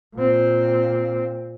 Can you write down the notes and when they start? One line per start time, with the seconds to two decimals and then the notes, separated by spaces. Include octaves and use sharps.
0.15 A#2 C4